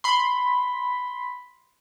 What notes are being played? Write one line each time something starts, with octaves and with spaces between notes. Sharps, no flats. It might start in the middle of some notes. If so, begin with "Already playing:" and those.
B5 C6